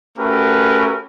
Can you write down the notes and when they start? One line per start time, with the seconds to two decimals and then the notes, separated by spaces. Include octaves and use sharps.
0.18 A3 C#4 F#4 G4 A#4 B4